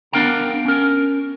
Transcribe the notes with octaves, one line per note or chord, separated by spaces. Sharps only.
B3 D4 A#4 F5 G5 A#5
C#4 A#4